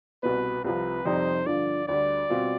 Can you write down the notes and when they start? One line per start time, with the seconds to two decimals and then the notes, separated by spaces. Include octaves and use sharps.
0.23 C2 B2 B3 B4
0.64 C2 C3 F3 B4
1.05 F2 C3 G3 C4 D#4 C5
1.46 G2 D3 F3 D5
1.88 D2 D3 G3 D5
2.30 B2 G3 C4 F4